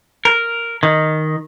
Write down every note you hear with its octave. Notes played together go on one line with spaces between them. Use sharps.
A#4
D#3